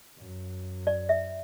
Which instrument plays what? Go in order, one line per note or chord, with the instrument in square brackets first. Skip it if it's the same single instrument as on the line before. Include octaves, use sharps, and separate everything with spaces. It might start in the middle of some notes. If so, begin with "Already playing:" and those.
[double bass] F#2
[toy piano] D5
E5